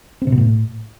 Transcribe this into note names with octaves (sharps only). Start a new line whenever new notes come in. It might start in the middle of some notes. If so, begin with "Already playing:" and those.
C4
C3
B2
A2